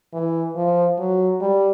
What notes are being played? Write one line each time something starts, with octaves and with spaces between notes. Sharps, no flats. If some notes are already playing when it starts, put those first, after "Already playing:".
E3
F3
F#3
G3